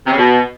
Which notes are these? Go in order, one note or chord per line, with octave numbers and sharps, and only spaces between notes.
C3
C#3
B2